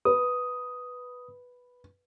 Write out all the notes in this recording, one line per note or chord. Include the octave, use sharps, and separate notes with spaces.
B4 D#6